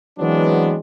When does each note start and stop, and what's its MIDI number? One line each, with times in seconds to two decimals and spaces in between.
0.19 0.77 52
0.19 0.77 54
0.19 0.77 56
0.19 0.77 59
0.19 0.77 60
0.19 0.77 62